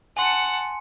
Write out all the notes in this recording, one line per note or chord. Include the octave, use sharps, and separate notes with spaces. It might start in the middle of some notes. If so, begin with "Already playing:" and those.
F#5 G#5 A5 C6 C#7